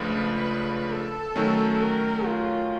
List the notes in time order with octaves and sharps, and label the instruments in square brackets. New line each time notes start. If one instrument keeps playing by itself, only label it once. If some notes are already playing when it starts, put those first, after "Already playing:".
Already playing: [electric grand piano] C#2 C#3 F3 A3 D4 [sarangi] B4
[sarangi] A4
[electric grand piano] D#3 F#3 A3 C#4
[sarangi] A#4
F4